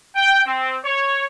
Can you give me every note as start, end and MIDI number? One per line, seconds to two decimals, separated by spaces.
0.16 0.40 79
0.46 0.77 60
0.84 1.23 73